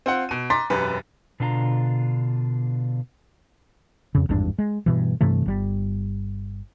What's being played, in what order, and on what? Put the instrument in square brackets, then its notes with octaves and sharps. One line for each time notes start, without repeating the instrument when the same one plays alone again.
[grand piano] C4 F4 F#5
B2 D#7
A#5 C6 D6 A6 B6
E1 F#2 G4 B4
[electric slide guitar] B2 D3 D4 F4 G#5 A#5
[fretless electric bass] F2 C#3
G#1 E2 G2 D4
G#3
G2 B2 E3
G2 C3 E3 A3
G1 G3